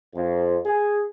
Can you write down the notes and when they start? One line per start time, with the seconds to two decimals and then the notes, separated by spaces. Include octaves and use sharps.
0.15 F2
0.65 G#4